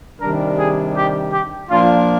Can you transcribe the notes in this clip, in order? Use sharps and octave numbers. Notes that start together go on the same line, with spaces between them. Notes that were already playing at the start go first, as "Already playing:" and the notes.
C3 D#3 G3 D4 A#4
G#4
G4
G4
A#2 F3 A#3 D4 F4